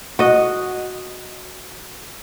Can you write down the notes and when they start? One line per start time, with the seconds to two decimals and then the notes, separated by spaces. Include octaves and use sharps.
0.19 F#4 D#5